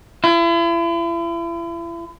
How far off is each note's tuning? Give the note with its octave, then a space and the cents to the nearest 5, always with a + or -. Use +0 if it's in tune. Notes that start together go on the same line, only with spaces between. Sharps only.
E4 +40